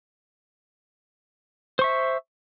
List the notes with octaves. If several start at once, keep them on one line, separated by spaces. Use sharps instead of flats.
C5 E5 C#6